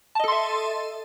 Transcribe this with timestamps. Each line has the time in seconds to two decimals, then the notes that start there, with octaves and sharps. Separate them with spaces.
0.15 A5
0.20 D#5
0.24 A4
0.28 C6
0.32 E5